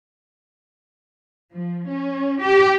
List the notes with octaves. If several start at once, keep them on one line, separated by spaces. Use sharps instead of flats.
F3
C#4
G4